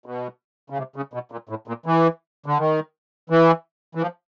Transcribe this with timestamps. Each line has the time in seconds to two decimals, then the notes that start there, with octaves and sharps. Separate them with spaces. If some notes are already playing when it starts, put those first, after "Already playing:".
0.06 B2
0.70 C#3
0.77 C3
0.96 C#3
1.14 B2
1.32 A#2
1.49 A2
1.68 A#2
1.86 E3
2.46 D3
2.58 D#3
3.30 E3
3.95 E3
4.01 F3